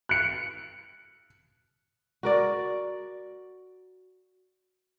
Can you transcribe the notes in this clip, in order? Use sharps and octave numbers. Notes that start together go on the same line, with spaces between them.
F#6 C#7
F#4 A#4 D5